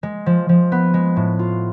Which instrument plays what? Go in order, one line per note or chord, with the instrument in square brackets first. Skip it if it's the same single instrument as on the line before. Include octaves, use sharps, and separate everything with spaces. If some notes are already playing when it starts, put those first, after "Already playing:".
[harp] G#3
F3
F3
B3
G#3
A2
F4